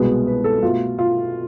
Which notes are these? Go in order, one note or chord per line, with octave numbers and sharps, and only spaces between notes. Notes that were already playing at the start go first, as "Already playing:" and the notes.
Already playing: C2 B2 G#3 B3
B4
A4
B2 A3 F4
F4